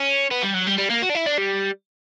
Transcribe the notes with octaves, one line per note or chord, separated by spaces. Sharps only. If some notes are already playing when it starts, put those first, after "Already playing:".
Already playing: C#4
B3
G3
F#3
G3
G3
A#3
F#4
D4
E4
D4
G3